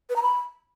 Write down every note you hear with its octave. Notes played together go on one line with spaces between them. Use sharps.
B4
A#5
B5